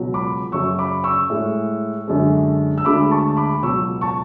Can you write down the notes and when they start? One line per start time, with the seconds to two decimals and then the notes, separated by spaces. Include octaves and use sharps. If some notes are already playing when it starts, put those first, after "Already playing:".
Already playing: C#2 B2 F#3
0.14 B5 D6
0.52 F#2 C#3 F#3 C#6 E6
0.79 B5 D6
1.04 C#6 E6
1.30 A2 G#3
2.08 F#2 D3 G#3
2.78 E6
2.85 D2 D3 G#3 B5 D6
3.11 A5 C#6
3.37 B5 D6
3.62 C#2 B2 F#3 C#6 E6
4.01 A5 C#6